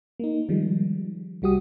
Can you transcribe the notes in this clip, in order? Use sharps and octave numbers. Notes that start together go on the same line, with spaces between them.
A#3 D#4
D#3 F3 G3 G#3
C2 G3 F#4 G4 D#6